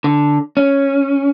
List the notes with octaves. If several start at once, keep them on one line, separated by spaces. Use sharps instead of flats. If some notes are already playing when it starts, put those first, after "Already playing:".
D3
C#4